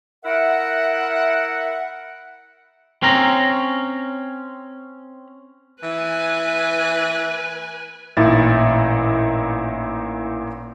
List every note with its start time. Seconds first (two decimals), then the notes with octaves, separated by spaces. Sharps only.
0.25 E4 A#4 E5 F#5
3.03 C4 C#4 A#5
5.83 E3 B4 G#5
8.17 A1 A#2 D#4 E4 A6